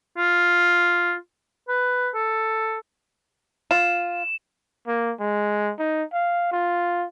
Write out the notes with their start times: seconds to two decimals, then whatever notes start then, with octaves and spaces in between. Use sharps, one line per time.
0.17 F4
1.68 B4
2.14 A4
3.71 F4 E7
4.87 A#3
5.20 G#3
5.79 D#4
6.13 F5
6.52 F4